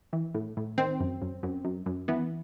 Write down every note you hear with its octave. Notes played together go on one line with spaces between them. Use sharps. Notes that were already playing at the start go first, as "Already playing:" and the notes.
E3
A2
A2
D#3 C4
F#2
F#2
F#2
F#2
F#2
E3 B3